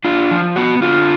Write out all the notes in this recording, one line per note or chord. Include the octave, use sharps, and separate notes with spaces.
D4 F4
F3
B3 F#4
D3 F4